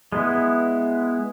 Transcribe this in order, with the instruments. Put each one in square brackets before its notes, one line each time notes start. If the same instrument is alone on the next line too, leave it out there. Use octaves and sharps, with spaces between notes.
[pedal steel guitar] G#3 B3 E4